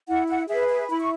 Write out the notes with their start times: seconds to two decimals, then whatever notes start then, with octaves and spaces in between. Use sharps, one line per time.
0.07 E4 F#5
0.28 F#5
0.49 G#4 B4 E5
0.69 E5
0.90 E4 B5
1.00 C#6